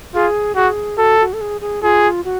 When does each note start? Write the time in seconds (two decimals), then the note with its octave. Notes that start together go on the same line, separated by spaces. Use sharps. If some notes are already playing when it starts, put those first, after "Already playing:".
0.15 F4 G#4
0.56 F#4 G#4
0.98 F#4 A4
1.20 F#4
1.33 A4
1.41 G#4
1.61 G#4
1.83 F4 G#4
2.25 F#4